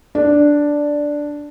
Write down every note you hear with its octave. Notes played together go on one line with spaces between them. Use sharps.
D4